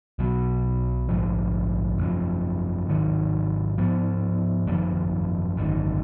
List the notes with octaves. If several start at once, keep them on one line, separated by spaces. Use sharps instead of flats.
B1 B2 F#3
A#1 G#2 F3
F#1 F#2 F3
G#2 D#3 F#3
G#2 F3 B3
G#1 F#2 F3 A#3
G#1 F#2 D#3